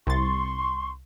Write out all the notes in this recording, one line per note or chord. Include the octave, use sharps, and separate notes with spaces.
C2 C6 C#6 A6